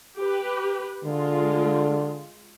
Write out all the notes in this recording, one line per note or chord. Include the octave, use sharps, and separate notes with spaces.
G4 B4
D3 G#3 F4